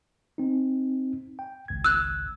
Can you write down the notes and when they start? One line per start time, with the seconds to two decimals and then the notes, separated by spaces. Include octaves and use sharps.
0.38 C4 D#4
1.39 G5
1.68 G#1 C#2 G#6
1.84 E6 F#6